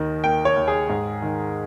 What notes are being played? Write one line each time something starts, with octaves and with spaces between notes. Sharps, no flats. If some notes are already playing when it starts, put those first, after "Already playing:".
Already playing: D#2 D#3
A#3 G5
C#5
D#2
G#4
G#2
D#3